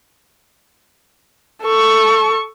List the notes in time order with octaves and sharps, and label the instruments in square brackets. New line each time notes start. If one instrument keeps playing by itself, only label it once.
[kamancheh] A4 C#6